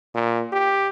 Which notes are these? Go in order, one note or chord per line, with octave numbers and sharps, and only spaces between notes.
A#2
G4